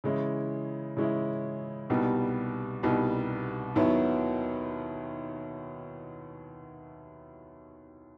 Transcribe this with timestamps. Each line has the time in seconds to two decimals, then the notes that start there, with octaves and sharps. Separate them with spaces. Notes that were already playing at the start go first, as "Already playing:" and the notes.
0.04 C#3 E3 G#3 C#4 E4
0.97 C#3 E3 G#3 C#4 E4
1.90 C2 B2 G3 B3 D#4
2.83 C2 B2 G3 B3 D#4
3.76 D#2 D#3 F#3 B3 E4